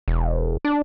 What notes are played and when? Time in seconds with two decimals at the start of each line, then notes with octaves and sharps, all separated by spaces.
0.08 E1
0.65 D4